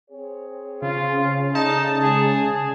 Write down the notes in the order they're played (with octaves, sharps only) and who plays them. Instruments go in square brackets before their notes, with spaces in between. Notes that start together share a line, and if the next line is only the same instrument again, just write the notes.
[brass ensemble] C4 G#4 C#5
[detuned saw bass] C#3 [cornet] F4
[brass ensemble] A3 G#4 D5 [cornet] D#4 [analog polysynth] A5
[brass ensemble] G#3 [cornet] G#4